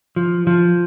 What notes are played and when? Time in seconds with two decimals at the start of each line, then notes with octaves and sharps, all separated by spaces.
0.16 F3
0.47 F3